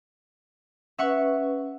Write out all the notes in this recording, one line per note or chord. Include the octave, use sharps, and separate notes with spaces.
C#4 B4 E5 F#5 C#6